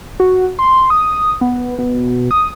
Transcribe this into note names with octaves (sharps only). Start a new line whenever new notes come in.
F#4
C6
D#6
B3
B2
D#6